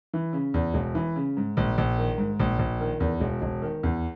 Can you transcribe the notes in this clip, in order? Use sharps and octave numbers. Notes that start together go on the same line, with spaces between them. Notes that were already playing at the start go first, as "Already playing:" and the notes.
E3
C#3
E2
E1
E3
C#3
G#2
A#1
A#1
D#3
G#2
A#1
A#1
D#3
E2
E1
E1
D#3
E2